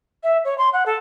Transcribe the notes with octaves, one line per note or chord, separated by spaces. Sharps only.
E5
C#5
C6
F#5
A4